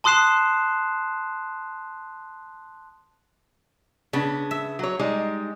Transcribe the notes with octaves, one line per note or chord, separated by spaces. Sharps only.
A5 C6 D#6 F#6 C7 E7
C#3 B3 D4
E5
F#3 C#5
G3 G#3 D#4